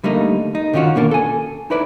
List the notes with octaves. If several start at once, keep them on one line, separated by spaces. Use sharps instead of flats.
D3 G3 A3 A#3 D#4
D#4
D3 D#3 C#4 F4 F#4
D#2 B2 A#3 D4
A4 G#5
D#4 E4 B4 D5